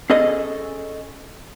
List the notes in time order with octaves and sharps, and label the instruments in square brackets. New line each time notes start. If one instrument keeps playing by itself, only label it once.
[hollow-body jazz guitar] C#4 G#4 A4 D#5